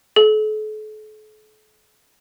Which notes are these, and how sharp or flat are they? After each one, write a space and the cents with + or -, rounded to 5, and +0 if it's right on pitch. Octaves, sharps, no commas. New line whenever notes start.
A4 -40